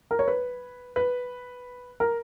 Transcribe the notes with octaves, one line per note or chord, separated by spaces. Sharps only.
A#4
C#5
B4
B4
A#4